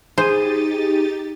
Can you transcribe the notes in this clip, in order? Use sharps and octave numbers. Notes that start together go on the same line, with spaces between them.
D#4 G4 G#4 C5 A6 D#7